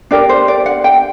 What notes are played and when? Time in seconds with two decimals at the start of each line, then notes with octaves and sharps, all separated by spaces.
0.11 D4 G4 A#4 D5
0.29 C5
0.48 D5
0.66 F#5
0.84 G5